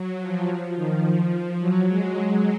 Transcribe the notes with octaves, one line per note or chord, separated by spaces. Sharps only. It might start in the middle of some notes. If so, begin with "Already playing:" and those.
Already playing: F#3
F3
F3
D#3
F3
F#3
G#3